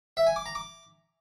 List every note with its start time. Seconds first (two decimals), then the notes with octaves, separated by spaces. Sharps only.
0.17 E5
0.27 G#5
0.36 D6
0.46 A#5
0.55 D6